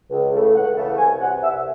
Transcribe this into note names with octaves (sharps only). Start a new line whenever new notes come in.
C#2
C#3 E3 A3
C#2 F#5
C#3 E3 A3
C2 G#5
C3 E3 F#5
C2 E5